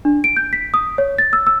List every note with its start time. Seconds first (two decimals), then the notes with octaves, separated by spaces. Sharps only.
0.05 D4
0.24 D7
0.37 G6
0.53 B6
0.74 D#6
0.98 C#5
1.18 A6
1.33 E6
1.47 E6